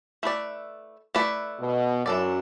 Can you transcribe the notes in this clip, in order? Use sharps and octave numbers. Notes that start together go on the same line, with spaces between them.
A3 E4 B4 D5
A3 E4 B4 D5
B2
F#2 E3 D4 A4 D5